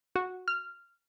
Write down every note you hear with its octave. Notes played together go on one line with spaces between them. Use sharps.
F#4
F6